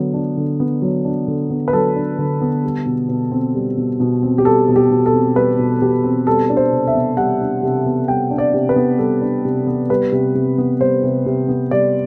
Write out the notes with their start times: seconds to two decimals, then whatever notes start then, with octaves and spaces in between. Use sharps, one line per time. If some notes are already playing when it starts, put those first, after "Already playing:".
Already playing: D3 F#3 B3
0.14 D4
0.37 D3
0.60 B3
0.82 F#3
1.05 D4
1.28 D3
1.50 B3
1.68 B4
1.73 F#3 A4
1.96 D4
2.18 D3
2.41 B3
2.64 G3
2.86 B2
3.09 B2
3.32 C4
3.55 G3
3.77 B2
4.00 B2
4.23 C4
4.38 G4
4.45 G3 A4
4.68 B2
4.76 G4
4.91 B2
5.06 A4
5.14 C4
5.36 G3 B4
5.59 B2
5.82 B2 G4
6.04 C4
6.26 G3 A4
6.50 D4
6.57 C5
6.72 C3
6.87 E5
6.95 B3
7.17 G3 F#5
7.41 D4
7.63 C3
7.86 B3
8.08 G3 G5
8.31 D4
8.38 D5
8.54 C3
8.69 B4
8.76 B3
8.99 G3 A4
9.22 D4
9.45 C3
9.67 B3
9.90 G3 B4
10.12 C3
10.35 C3
10.58 B3
10.81 G3 C5
11.03 C3
11.26 C3
11.48 B3
11.71 G3 D5